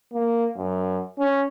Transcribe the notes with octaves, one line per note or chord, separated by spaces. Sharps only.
A#3
F#2
C#4